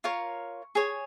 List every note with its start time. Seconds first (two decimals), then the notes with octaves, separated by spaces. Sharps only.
0.04 F4 A#4 C#5 C#6
0.75 G#4 C#5